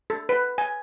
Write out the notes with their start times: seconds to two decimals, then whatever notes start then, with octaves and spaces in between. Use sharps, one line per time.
0.10 A4
0.29 B4
0.58 G#5